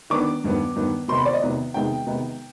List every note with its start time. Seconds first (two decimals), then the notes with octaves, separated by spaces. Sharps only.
0.10 D#3 B3 D4 D6
0.44 G2 D#3 B3
0.76 G2 D#3 B3
1.08 C3 D#3 B3 D#4 C6
1.17 B5
1.25 D5
1.33 D#5
1.42 C3 D#3 B3 D#4
1.74 C3 D#3 G#3 B3 D#4 G5
2.06 C3 D#3 G#3 B3 D#4